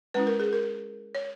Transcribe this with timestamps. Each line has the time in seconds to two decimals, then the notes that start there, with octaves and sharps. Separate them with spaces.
0.14 G#3 C#4 E4 B4
0.27 A#4
0.40 G#4
0.53 A#4
1.15 C#5